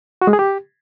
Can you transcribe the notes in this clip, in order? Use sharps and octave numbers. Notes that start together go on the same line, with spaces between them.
F#4
G#3
G#4
G4